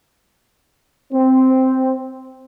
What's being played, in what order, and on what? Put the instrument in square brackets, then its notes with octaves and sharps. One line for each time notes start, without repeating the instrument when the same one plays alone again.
[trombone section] C4